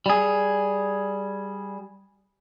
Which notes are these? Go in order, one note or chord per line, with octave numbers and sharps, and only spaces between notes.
G3 G#4